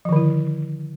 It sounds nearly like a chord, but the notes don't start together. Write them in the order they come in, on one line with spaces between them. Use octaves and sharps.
F3 D#3 D3 E4